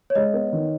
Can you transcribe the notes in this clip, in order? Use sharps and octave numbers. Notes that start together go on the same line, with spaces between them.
C#5
G#3 D#5
B3
D#3